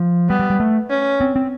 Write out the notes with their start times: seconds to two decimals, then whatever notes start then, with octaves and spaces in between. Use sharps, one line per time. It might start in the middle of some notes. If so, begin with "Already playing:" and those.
Already playing: F3
0.29 G3 B3
0.40 G3
0.50 G3
0.60 A3
0.90 C#4
1.21 C4
1.36 C4